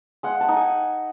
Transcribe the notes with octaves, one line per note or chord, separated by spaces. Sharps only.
G#3 F#5
A5
D#4
G#5